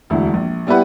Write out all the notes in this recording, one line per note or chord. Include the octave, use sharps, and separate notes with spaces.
E1 D2 E4
A#1
G3 B3 E4 G4 B4 F#5